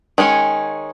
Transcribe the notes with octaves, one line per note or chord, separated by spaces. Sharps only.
D#3 G#3 C#4 C#5